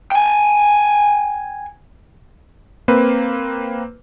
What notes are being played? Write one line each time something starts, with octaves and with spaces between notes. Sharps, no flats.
G5 G#5
A#3 C4 B4